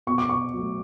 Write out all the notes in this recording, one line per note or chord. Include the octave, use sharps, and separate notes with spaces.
B2 C#6
D6
C#6
F#3 A3